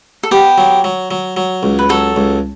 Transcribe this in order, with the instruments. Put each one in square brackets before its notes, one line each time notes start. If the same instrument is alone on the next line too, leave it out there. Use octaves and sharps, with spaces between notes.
[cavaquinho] A4
[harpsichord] B3 [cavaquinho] G4
[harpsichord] F#3
F#3
F#3
F#3
C#2
[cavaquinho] B4
[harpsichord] F#3 [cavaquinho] A4
[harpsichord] C#2